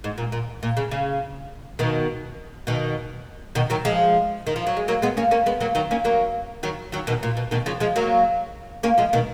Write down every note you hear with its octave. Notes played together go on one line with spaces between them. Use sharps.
G#2
A#2
A#2
A#2
C#3
C#3
B2 D#3
B2 D#3
B2 D#3
D#3 F#3
F3 G#3
D#3
F3
F#3
G#3
F#3 A#3
G#3 B3
A#3 C#4
A#3 C#4
G#3 B3
F#3 A#3
D#3 F#3
A#3 C#4
F#3 A#3
D#3 F#3
D#3 F#3
B2 D#3
A#2
B2
B2 D#3
C#3 F3
F3 G#3
F#3 A#3
A#3 C#4
F3 G#3
B2 D#3